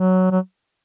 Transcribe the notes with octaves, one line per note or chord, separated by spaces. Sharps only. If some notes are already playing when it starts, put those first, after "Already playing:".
Already playing: F#3
F#3